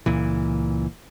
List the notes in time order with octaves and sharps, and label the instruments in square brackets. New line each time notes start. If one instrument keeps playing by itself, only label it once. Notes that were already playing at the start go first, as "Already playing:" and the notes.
[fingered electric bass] C#2 A#2 E3